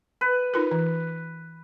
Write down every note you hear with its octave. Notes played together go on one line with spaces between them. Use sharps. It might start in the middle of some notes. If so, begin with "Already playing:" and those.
B4
D#4 F4 A#4
E3